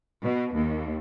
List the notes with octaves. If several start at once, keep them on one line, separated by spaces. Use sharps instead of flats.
B2
D#2